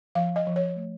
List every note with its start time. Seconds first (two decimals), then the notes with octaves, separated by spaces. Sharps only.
0.15 F3 F5
0.36 D#5
0.47 F3
0.56 C#5
0.76 A3